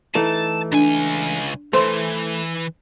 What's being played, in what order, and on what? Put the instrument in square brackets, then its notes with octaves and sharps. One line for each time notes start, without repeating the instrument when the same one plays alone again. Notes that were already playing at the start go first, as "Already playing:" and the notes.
[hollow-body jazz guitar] E3 A3 D#4 [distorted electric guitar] A5
[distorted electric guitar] C#2 G#5 [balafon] D4
[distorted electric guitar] E3 [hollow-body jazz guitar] A3 [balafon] C5 C6